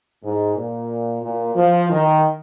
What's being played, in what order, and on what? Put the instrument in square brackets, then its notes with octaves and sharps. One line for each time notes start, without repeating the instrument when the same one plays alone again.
[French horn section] G#2
A#2
A#2
F3
D#3